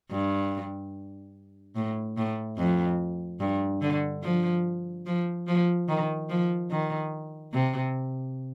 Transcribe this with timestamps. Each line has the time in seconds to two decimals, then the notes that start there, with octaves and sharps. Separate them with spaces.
0.11 G2
1.76 A2
2.17 A2
2.58 F2
3.40 G2
3.81 D3
4.23 F3
5.06 F3
5.47 F3
5.89 D#3
6.29 F3
6.70 D#3
7.53 C3